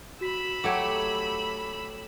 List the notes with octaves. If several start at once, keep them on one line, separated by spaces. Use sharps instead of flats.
F#4 B5 E6 B6
F#3 A3 G4 D6 G#6